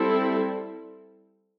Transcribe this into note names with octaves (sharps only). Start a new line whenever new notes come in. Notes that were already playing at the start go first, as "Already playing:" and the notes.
Already playing: G3 C4 E4 A4